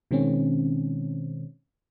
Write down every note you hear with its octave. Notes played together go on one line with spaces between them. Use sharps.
B2 D#3 G#3 C4 C#4